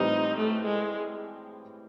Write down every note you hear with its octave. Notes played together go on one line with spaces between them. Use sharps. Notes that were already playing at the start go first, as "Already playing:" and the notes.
Already playing: A2 E3 G3 C4 D#4
A3
G#3